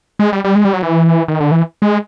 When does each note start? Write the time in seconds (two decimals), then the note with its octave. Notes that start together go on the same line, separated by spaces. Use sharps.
0.19 G#3
0.33 G3
0.44 G3
0.55 G#3
0.65 G3
0.73 F#3
0.83 E3
1.28 D#3
1.40 D3
1.51 E3
1.82 G#3